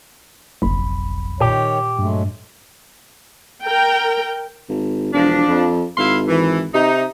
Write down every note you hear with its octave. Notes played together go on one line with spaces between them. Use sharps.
F#1 B1 F2 B5
A#2 D#3 G4 C#5
G2 F#3 G#3 A3
A#4 G5
G#1
E1 F3 D4
F2
G#1 E4 F5 C6
E3
C3 D#4